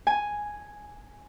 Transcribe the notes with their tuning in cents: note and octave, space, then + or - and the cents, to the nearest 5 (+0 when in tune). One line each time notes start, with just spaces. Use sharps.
G#5 +0